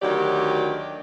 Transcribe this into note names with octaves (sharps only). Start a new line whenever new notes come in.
D2 D#3 F#3 G4 D5